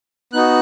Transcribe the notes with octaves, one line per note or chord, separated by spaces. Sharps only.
B3 D#4 F#4 F#6